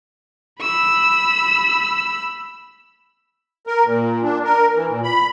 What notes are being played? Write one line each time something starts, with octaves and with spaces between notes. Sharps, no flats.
B5 E6
A#4
A#2
D4
A#4
E3
A#2
B5